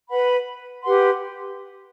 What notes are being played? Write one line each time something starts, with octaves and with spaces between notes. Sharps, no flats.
B4 F#5 B5
G4 B4 F#5 C6